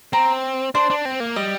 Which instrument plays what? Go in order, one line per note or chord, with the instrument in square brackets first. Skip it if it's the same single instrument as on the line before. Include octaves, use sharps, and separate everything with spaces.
[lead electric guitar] C4 [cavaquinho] A#5
[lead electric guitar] D4 [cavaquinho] C5
[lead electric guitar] D4
C4
A#3
[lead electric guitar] G3 [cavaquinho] D#5